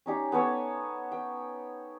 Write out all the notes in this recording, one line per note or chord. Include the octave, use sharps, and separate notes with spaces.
C#4 D#4 G4
B3 A4 C#5 G#5
G5